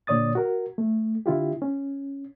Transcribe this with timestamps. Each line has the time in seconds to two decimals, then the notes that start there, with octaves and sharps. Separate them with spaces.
0.07 A#2 D3 C#5 D5 D#6 A6
0.35 F#4 A#4
0.78 A3
1.26 D3 E4 F4 G4
1.62 C#4